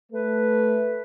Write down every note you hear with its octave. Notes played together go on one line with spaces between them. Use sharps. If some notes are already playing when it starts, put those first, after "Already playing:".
A3 B4